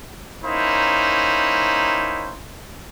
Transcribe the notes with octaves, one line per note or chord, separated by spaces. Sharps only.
A#3 C#4 D#4 E4 C5